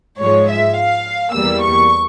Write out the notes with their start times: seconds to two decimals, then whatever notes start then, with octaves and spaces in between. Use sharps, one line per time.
0.19 G#2 F3 G#3 C#5
0.48 E5
0.76 F5
1.33 E2 E3 G3 A#3 E6
1.62 C#6